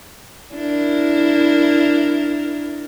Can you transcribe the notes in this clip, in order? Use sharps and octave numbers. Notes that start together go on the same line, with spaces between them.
D4 E4 A#4